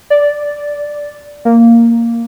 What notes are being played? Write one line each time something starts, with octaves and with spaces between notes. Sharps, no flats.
D5
A#3